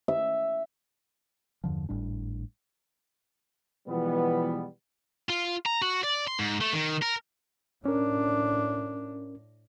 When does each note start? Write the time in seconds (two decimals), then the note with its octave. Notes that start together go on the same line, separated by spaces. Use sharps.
0.08 E5
1.64 E2 G2 D3 F3
1.89 G#1 A2 G3 D4
3.88 B2 E3 F3 G3 G#3 B3
5.30 F4
5.66 A#5
5.82 F#4
6.03 D5
6.27 C6
6.39 G#2
6.61 A3
6.73 D#3
7.02 A#4
7.85 A2 C#4 D4 A#4